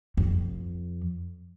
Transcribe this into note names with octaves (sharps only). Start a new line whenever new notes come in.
F2